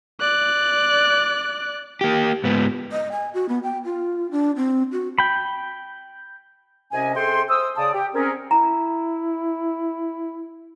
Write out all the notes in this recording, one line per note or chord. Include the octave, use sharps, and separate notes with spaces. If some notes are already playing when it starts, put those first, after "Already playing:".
D5 F#6
A#3 G4
G#2 B3
D#5
G#5
F#4
B3
G5
F4
D4
C4
F#4
G5 B5
C2 C3 C#4 D#5 G#5
C3 G#4 A4 G5 C6
C5 D#6 E6
C#3 D5 A5 D#6
G4 G5
C4 C#4 G#4 A#4
E4 A#5